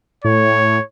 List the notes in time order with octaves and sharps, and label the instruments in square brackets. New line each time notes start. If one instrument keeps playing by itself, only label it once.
[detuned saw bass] A2 [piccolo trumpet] C#5